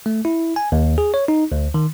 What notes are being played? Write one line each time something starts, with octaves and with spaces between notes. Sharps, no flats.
A3
E4
G#5
D#2
G#4
C#5
D#4
D2
D#3